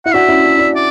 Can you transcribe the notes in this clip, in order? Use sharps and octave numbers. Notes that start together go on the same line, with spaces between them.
E4 F#5
D4 F#4 E5
C#4 E4
D4
D4
D5